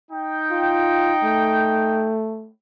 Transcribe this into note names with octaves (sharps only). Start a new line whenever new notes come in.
D#4 G5
F4
A3